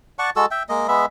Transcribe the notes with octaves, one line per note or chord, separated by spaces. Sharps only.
D5 F#5 A5 C#6
G#3 F#4 A4 E6
E5 G5
G#3 A#3 D#5
G#3 B3 E5 B5